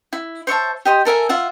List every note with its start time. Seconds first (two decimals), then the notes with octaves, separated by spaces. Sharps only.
0.13 E4
0.47 C5 C#5 E5 A5
0.85 G4 D#5 C6
1.05 A4 A#4 E5 G#5
1.29 F4 E5 F#5